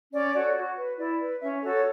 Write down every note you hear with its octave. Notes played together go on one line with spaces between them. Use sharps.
C#4 D5
F#4 A4 C#5
F#4
B4
E4 D5
B4
C#4 E5
F#4 A4 C#5